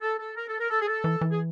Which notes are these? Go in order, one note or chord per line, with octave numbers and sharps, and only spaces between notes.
A4
A4
A#4
A4
A#4
A4
G#4
A4
E3
E3
G#4